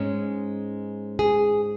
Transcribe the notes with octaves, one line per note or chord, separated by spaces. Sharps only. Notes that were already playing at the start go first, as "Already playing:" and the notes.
Already playing: G#2 G#3 C#4
G#4